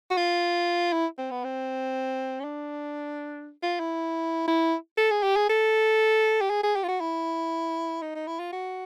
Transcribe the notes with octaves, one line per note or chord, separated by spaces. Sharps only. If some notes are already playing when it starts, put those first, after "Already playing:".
F#4
F4
E4
C4
B3
C4
C#4
D4
F4
E4
E4
A4
G#4
G4
G#4
A4
G4
G#4
G#4
G4
F4
F#4
E4
D#4
D#4
E4
F4
F#4